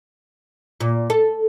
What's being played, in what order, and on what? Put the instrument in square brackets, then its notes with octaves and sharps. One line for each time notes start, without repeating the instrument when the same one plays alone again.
[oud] A#2
A4